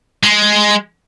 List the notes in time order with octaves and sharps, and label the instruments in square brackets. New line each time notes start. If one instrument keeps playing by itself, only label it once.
[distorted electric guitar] G#3